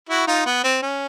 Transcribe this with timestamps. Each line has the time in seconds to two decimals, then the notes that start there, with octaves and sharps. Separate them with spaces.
0.09 E4 F#4
0.27 D#4 F4
0.46 B3
0.64 C4
0.82 C#4